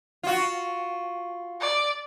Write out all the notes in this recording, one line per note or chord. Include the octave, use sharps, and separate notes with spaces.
F4 F#4
D5